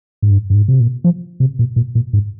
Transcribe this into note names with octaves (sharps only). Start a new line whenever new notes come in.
G#2
G2
G2
G#2
C3
A#2
F3
C3
A#2
A#2
A#2
G#2